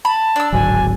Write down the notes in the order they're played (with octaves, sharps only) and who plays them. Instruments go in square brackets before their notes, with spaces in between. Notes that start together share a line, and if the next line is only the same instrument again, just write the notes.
[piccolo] A5 [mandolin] B5
[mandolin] D4 E6
[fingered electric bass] D1 G#1 F#3 [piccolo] G#5